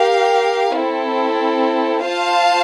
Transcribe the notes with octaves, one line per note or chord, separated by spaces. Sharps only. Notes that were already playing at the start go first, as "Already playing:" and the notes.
Already playing: G4 A#4 F5
C4 E4 A4
F4 C5 F5 A5